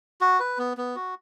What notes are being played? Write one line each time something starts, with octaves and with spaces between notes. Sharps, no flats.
F#4
B4
B3
B3
F#4